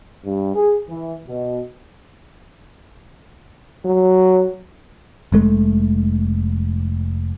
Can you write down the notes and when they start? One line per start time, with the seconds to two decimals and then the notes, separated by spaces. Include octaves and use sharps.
0.25 G2
0.55 G#4
0.89 E3
1.27 B2
3.85 F#3
5.32 F1 G#3 A3